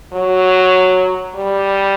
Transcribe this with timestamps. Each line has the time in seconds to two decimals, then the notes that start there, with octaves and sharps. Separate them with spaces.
0.13 F#3
1.35 G3